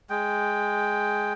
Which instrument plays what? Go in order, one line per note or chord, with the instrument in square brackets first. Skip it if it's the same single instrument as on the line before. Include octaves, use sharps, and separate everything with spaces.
[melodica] G#3 G5